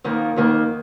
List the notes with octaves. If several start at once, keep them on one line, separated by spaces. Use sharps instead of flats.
F2 D#3 A#3
F2 D#3 A#3